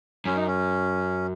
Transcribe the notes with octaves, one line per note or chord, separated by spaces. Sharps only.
F#2 C#4
D#4
C#4